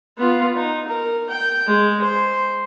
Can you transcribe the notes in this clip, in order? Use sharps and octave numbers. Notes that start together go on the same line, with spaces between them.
B3 F4
D#4
A#4
G5
G#3
C5